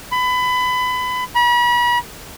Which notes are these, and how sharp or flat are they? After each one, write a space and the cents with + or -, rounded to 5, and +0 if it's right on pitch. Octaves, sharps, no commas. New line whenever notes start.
B5 +25
B5 -40